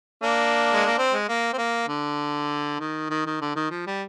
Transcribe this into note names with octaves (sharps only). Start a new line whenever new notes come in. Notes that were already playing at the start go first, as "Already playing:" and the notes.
A#3 D4
G#3
A#3
C4
G#3
A#3
C4
A#3
D3
D#3
D#3
D#3
D3
D#3
F3
G3